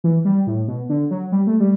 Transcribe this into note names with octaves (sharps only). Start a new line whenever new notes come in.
E3
G3
A2
B2
D3
F#3
G3
A3
G3